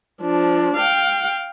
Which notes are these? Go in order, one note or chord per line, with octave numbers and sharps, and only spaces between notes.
F3 D4
F5 G5